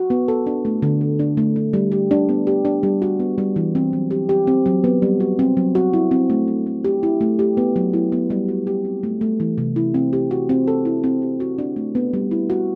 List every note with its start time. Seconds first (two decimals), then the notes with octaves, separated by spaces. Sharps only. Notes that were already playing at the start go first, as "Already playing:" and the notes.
Already playing: F#4
0.10 B3
0.28 A4
0.46 D4
0.65 A3
0.82 D3
1.01 A4
1.19 D4
1.37 A3
1.56 D4
1.73 G3
1.92 G4
2.11 D4
2.29 B3
2.47 G4
2.65 D4
2.83 G3
3.02 F#4
3.20 B3
3.38 G3
3.56 E3
3.75 C4
3.93 F#3
4.11 G4
4.29 G4
4.47 C4
4.66 F#3
4.84 B3
5.02 G3
5.20 F#4
5.39 C4
5.57 F#3
5.75 F#4
5.93 E4
6.11 C4
6.30 A3
6.48 D4
6.66 A3
6.84 G4
7.03 E4
7.21 A3
7.39 G4
7.57 B3
7.76 F#3
7.93 E4
8.12 B3
8.30 G3
8.48 F#4
8.67 G4
8.85 C4
9.03 A3
9.21 A3
9.40 E3
9.58 C3
9.76 E4
9.94 C4
10.13 G4
10.31 F#4
10.49 C4
10.68 A4
10.85 E4
11.04 C4
11.22 G4
11.40 F#4
11.58 D4
11.76 A3
11.95 B3
12.13 G3
12.31 E4
12.50 F#4